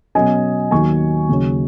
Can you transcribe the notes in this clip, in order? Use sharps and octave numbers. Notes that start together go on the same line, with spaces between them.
B2 F#3 C#4 D#5 G#5
D#2 D#3 F#3 G#5 C#6
D#2 C#3 F#3 C#4